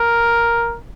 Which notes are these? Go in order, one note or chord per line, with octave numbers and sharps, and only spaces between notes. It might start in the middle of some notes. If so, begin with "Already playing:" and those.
Already playing: A#4